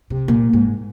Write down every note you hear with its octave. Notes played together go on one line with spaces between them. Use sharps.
C3
A#2
G#2